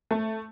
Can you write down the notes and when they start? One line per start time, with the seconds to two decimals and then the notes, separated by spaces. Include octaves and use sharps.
0.11 A3